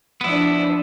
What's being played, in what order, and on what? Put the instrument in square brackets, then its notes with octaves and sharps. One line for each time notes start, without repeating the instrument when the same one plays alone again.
[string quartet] F3 D4 [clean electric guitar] B3 E4